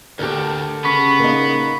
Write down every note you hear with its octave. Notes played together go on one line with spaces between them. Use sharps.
D2 G4 A4 A#4
C#3 B3 B5 C#6 B6
A#3 D#4